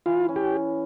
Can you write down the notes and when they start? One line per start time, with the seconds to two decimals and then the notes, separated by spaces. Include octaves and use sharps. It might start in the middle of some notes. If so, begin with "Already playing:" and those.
0.06 E3 F4
0.28 C#4
0.36 G4